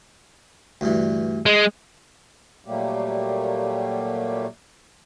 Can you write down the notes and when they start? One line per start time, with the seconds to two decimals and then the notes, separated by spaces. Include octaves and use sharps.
0.81 D2 G2 E3
1.46 G#3
2.65 A#2 F#3 G3 A3 A#3 G4